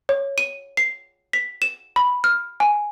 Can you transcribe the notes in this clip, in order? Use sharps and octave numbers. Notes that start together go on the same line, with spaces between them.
C#5
D#7
C7
B6
E7
B5
F6
G#5